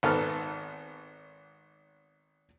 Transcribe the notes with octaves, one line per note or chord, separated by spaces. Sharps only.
G#1 G#2 B3 A4 A#5 F6